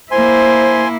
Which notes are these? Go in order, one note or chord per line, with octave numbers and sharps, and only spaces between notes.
A#3 E4 C5 G#5 C6